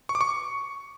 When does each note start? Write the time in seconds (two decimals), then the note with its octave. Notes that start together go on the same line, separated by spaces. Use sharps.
0.09 C#6
0.15 D6
0.21 C#6